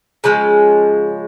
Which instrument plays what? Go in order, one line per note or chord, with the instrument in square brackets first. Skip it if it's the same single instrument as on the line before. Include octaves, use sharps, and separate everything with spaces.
[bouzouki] C#3 F3 G#3